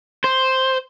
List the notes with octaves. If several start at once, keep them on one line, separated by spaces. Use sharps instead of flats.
C5